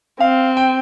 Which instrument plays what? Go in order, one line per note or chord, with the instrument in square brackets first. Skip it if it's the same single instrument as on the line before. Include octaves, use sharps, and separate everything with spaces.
[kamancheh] C4 [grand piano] F5
[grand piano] G5